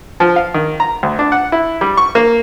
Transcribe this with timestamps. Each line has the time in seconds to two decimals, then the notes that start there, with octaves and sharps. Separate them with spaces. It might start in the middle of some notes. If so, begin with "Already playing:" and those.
0.20 F3
0.36 F5
0.54 D#3
0.80 A#5
1.03 D2
1.19 D4
1.32 F#5
1.52 E4
1.81 G3
1.97 C#6
2.15 A#3